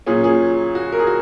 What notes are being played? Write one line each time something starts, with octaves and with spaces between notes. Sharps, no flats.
A#2 F#3 C#4 G#4
G#4
F#4
A#4
G#4
F#4